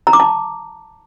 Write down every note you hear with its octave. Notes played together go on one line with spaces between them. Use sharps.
A#5
D6
A5